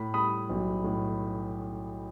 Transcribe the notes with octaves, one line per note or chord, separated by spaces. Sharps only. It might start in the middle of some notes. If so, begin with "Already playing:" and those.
Already playing: A2 B5
G3 B5 D#6
B1
A2